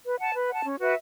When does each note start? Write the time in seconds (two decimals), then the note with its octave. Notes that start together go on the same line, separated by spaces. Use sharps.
0.04 B4
0.19 F#5 A5
0.34 B4
0.49 F#5 A5
0.64 C#4
0.80 F#4 B4 E5